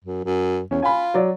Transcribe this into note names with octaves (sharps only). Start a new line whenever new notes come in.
F#2
F#2
E2 C#4
F4 G#5 B5
F#3 D5